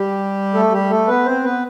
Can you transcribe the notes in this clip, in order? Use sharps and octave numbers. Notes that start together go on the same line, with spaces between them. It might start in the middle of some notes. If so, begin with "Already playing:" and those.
Already playing: G3 G4
A3 A4
G3 G4
A3 A4
B3 B4
C4 C5
B3 B4